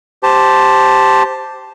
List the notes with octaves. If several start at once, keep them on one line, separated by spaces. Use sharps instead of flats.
G4 C5 A5